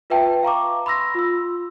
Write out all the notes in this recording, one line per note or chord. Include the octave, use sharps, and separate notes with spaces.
F4 B4 E5 G5 A5
F5 A#5 C#6 D6
B5 C6 E6 A#6
F4 E6